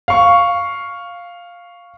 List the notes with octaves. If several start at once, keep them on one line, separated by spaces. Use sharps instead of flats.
F5 C#6